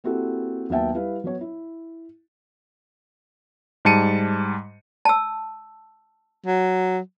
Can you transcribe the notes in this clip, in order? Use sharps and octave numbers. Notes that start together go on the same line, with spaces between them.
A#3 C4 E4 F#4 G4 A4
D#2 F#3 B3 E5 G5 A5
G3 E4 B4 F5
F#3 B3 C#5
E4
G#2 G3 A5 C#7 D#7
A5 E6
F#3